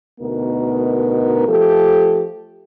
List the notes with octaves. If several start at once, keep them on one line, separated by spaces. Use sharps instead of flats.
D2 B2 B3 D#4 A#4
F3 A3 G4 A4